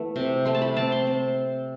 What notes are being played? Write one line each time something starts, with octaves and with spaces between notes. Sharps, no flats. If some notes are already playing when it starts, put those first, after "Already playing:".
Already playing: E3 A3 B3
C3
A3 C6
A5
B5
C4 A5
C6
C4